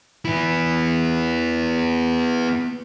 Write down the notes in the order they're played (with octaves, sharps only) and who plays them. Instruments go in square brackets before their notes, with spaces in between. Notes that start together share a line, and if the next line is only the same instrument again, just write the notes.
[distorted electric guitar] B3 E4